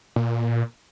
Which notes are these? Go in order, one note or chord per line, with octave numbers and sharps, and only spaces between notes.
A#2